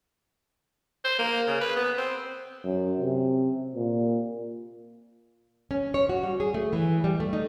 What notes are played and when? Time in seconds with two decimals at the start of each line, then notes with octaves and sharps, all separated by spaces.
1.04 C5
1.19 A#3
1.47 C#3
1.61 B4
1.76 B3
1.97 C4
2.64 F#2
3.01 C3
3.75 A#2
5.71 C#4
5.94 C#5
6.09 F#4
6.23 G3
6.40 G#4
6.54 A3
6.73 E3
7.04 G3
7.20 A3
7.33 D#4